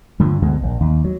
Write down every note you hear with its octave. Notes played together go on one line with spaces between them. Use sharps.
G2 D3 F3
D2 B2 G#3
A#1
D#2
F#3